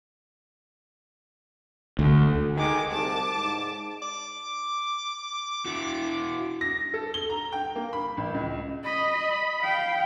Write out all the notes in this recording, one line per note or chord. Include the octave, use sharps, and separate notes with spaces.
D2
D#3 G#3 D6
C2 A5 D6
G#2
D6
E4 F#4
A#6
A4
G7
A#5
G5
A#3
B5
A1
C#2
D#5 B5
F5 G5